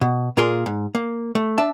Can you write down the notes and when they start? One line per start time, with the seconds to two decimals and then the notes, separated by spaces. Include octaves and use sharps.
0.01 B2
0.37 A#2 A#3 F4 G#4 A#4 C6
0.66 G#2
0.95 A#3
1.35 A3
1.58 D4 E5 A5